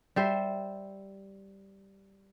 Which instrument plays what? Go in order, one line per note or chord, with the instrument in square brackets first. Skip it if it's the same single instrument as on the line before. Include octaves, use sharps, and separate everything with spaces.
[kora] G3 C5 E5